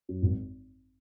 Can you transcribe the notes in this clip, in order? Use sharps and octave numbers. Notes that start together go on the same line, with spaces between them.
F#2
G#1